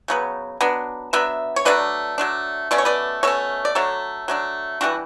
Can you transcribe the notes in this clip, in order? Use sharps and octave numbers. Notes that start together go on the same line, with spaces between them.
C#3 F#3 B3
F#3 B3 D4
F#3 B3 D4 E5
C#5
F#3 A3 D4 B4 D5
F#3 A3 D4
B2 A3 C#4 D5
C#5
B4 D5
B2 A3 C#4 A4 C#5
D5
F#3 A3 D4 A4 C#5
F#3 A3 D4
E3 G3 C#4 D4 F#4